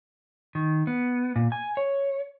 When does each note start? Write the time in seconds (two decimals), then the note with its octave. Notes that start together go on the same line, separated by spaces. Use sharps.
0.55 D#3
0.87 B3
1.36 A#2
1.52 G#5
1.77 C#5